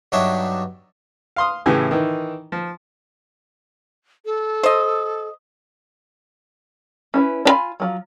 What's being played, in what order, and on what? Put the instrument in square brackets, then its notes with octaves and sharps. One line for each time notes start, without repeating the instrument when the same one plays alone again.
[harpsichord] G2 F#3 D4 D#4 C#5 E5
[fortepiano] F5 C6 D#6
A2 C#3 E3 G4 G#5
D#3 E3
F3
[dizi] A4
[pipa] C5 D#5
[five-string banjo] C#4 E4 B4
D4 F4 G#5 B5
F3 F#3